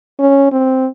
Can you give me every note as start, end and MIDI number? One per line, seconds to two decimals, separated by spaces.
0.19 0.47 61
0.52 0.87 60